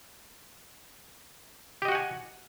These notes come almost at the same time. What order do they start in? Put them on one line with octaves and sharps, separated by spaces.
G4 D#5 F#4 F#5 G#5